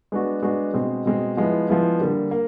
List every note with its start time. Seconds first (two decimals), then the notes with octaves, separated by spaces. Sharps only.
0.12 G#3 B3 D4 F#4
0.42 G#3 B3 D4 F#4
0.74 B2 G#3 C4
1.06 B2 G#3 C4
1.37 F3 G#3 B3 E4
1.68 F3 G#3 B3 E4
1.99 D3 G3 A#3
2.31 A#3